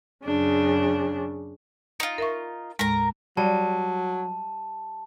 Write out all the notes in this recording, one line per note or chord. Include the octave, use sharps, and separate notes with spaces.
F#2 C#3 D4
D#4 F4
A#4 E5 C#6
D#2 A2 G#3 A#4 A#5
F#3 G3 A5